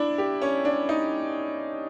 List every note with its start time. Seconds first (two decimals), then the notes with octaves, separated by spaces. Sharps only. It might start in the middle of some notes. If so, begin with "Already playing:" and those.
Already playing: D4 E4
0.18 G4
0.42 C#4
0.65 D4
0.89 D#4